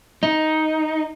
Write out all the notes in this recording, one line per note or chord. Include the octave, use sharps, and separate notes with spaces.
D#4